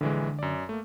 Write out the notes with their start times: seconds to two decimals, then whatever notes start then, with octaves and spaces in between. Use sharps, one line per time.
0.01 A#1 D3 E3 G#3
0.39 F#2 D5
0.69 A3 A#3